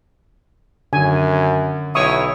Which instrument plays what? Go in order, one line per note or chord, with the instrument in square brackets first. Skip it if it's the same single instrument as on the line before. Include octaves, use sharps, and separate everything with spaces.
[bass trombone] F#2 [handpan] D3 D#3 [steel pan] G#5
[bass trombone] B1 [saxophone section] E4 C#5 [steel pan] C#6 D#6